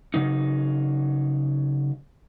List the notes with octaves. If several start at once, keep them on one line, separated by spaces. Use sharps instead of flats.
C#3 F#3 D#4